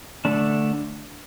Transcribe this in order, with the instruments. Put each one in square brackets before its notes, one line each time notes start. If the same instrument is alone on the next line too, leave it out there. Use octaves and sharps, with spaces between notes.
[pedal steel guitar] D3 A3 D4